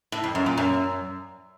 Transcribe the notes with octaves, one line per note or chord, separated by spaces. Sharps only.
A2
F2
F#2
A#2
F#2